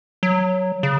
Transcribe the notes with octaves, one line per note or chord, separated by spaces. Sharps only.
F#3
C#3